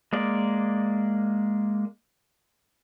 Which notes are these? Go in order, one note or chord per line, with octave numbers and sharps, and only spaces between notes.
G#3 A#3 D5